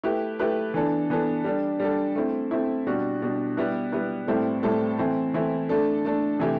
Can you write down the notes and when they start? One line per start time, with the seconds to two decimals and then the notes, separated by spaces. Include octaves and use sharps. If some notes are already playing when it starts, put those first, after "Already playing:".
0.04 A3 E4 G4 B4
0.39 A3 E4 G4 B4
0.74 E3 B3 D4 A4
1.10 E3 B3 D4 A4
1.44 G3 D4 A4
1.80 G3 D4 A4
2.15 A3 C4 E4
2.51 A3 C4 E4
2.87 B2 G3 D4 F#4
3.22 B2 G3 D4 F#4
3.57 G3 B3 E4 B4
3.92 G3 B3 E4 B4
4.28 A2 G3 C4 E4 A4
4.63 A2 G3 C4 E4 A4
4.99 E3 A3 C4 E4
5.34 E3 A3 C4 E4
5.69 A3 D4 A4
6.05 A3 D4 A4
6.39 C3 E3 A3 E4 G4